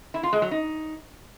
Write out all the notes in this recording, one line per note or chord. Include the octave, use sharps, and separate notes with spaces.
E4
F4
G#3
F#3
D#4